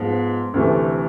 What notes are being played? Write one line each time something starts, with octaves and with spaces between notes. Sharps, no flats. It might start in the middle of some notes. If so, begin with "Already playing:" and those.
Already playing: G#2 F3 B3
D2 C3 E3 A3